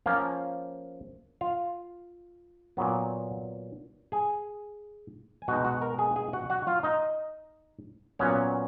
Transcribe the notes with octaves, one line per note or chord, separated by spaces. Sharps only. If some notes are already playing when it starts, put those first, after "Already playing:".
F3 A#3 C#4 F4 F5
F4 F5
A#2 F#3 B3
G#4 G#5
G#5
B2 G#3 D#4 F#4 F#5
F#4 F#5
A#4 A#5
G#4 G#5
G#4 G#5
F#4 F#5
F#4 F#5
F4 F5
D#4 D#5
A#2 F#3 B3 C#4 C#5